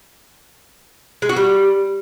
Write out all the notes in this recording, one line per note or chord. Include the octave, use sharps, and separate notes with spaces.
G#3
F#4
G3